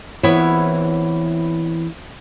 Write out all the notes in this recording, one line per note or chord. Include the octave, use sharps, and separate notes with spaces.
E3 B3 C4 E4 C#5